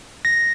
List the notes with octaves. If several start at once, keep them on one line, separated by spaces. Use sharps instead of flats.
A#6